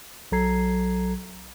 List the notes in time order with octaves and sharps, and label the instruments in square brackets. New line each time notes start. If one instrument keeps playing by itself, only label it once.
[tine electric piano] B1 F#3 A4 A#5 G#6 C7